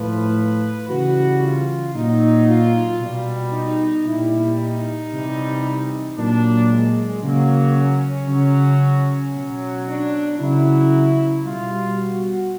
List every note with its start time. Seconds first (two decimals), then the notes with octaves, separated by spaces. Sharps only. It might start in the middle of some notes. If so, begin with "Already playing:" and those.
Already playing: A2 F3 B4
0.89 C#3 E3 G3 F#4
1.42 F4
1.94 A#2 F#3 D#4
2.47 F4
3.00 B2 G3
3.53 D#4
4.05 A#2 G3 E4
4.58 D#4
5.11 C3 E3 G3
6.17 A#2 F#3 D4
6.69 G#3
7.22 C#3 F#3 A#3
7.75 C#4
8.27 C#3 F#3
9.33 B2 F#3
9.86 D4
10.39 C#3 F#3 E4
11.44 B2 G3 F4
11.97 F#4